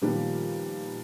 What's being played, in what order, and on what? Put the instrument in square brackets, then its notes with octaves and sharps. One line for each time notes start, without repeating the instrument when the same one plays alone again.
[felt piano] A#2 D#3 F3 G3 A#3 B3